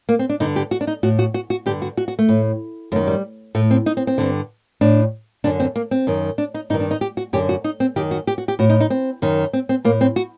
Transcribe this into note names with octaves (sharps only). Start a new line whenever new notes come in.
A#3
C4
D4
G2 D3 D#4
G4
F#4
D4
D#4
A2 F#4
F#4
F#4
F#4
G2 D3 G4
F#4
F#4
F#4
A3
A2
F#2 D#3 A3
G3
A2 A3
C4
D#4
C4
C4
G2 D3
A2 D4
F#2 D3 D4
C4
A#3
C4
F#2 D#3
D4
D#4
G2 D#3 D#4
D4
D#4
G4
F#4
F#2 D3 G4
F#4
D#4
C4
F#2 D#3 G4
F#4
G4
F#4
G4
A2 F#4
D#4
D#4
C4
F#2 D#3
C4
C4
A2 A#3
C4
F#4